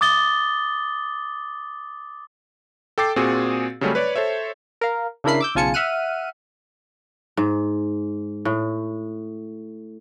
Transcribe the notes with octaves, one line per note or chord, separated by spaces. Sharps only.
D6 D#6 A6 G7
A4 G5 D6 A6 C7
A#2 C4 F#4 G#4
C#3 F#3 G3 A3 C4 C#4
B4 C#5 D5
A4 C5 C#5 E5
A#4 F5
C#3 D4 E4 A#4 B5 C7
D6 E6 G6
B1 C#3 F4 G#5 A5 C#7
E5 F#5 F6 F#6 D#7
G#2
A2